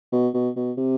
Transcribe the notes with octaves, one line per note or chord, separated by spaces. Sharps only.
B2
B2
B2
C3